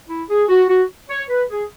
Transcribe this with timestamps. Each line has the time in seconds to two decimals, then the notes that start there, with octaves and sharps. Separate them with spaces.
0.09 E4
0.29 G#4
0.49 F#4
0.68 F#4
1.09 C#5
1.29 B4
1.50 G#4